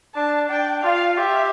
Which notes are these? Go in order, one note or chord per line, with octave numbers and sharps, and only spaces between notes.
D4 A5
D4 G5
F4 F5
G4 E5